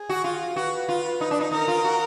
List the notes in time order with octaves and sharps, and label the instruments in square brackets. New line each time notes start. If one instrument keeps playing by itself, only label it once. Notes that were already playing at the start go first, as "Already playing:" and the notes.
Already playing: [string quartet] G#4
[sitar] F#4
F4
[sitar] F#4 [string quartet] B4
[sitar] F4
D#4
D4
D#4
[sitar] D#4 [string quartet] A#4
[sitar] F4
F#4